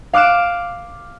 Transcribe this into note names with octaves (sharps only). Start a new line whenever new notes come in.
F5 D6 F#6 D7 E7